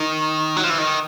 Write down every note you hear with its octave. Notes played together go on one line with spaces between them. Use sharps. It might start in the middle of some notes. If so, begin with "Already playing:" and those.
Already playing: D#3
F#3
F3
E3
D#3